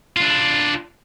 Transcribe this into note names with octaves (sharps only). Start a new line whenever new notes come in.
D4 F4